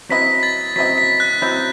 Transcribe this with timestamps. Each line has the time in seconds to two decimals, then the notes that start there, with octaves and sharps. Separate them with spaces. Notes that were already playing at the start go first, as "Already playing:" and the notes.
0.09 F#3 C4 E4 B4 D#5 B6
0.43 A6
0.76 F#3 C4 E4 B4 D#5 B6
0.98 B6
1.20 F#6
1.41 F#3 C4 E4 B4 D#5 G6